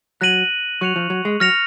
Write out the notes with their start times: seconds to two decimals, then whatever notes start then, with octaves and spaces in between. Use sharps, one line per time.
0.21 F#3 F#6 A#6 D#7 F#7
0.81 F#3 C#6 F#6 C#7 F7
0.96 F3
1.10 F#3
1.25 G#3
1.40 F#3 F6 A#6 C#7 F7